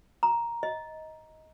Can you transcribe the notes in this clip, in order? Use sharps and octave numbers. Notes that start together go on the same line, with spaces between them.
A#5
D#5